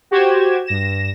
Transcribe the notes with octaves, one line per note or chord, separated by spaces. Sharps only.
F#4 G4 C5 G#6 E7
G2 A#6 E7